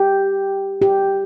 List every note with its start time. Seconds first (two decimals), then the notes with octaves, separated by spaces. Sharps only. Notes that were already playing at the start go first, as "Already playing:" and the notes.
Already playing: G4
0.82 G4